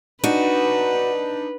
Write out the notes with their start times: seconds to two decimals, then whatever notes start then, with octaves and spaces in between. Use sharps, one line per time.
0.24 D4 D#4 F#4 B4 D#7